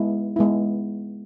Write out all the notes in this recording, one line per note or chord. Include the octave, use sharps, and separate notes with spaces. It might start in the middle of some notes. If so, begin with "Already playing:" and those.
Already playing: G#3 B3 E4
G#3 B3 E4